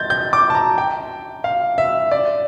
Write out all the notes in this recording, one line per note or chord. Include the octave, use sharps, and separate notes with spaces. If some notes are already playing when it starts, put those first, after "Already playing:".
Already playing: G6 A6
G6
D6
A5
A#5
G5
F5
E5
D5